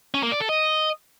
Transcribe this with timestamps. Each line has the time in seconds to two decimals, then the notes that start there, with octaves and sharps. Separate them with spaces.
0.14 C#4
0.23 A#3
0.32 D5
0.40 A4
0.49 D#5